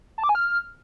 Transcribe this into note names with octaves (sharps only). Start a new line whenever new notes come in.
A5
D6
G#5
F6